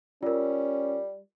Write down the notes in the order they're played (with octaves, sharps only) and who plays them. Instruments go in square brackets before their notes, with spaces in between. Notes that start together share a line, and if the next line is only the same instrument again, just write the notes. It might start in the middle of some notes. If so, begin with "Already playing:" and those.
[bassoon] G3 [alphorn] C#4 [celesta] F4 A#4